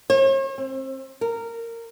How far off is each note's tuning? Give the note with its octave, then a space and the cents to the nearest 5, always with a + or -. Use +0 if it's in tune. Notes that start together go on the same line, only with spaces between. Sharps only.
C#5 -45
C4 +30
A#4 -15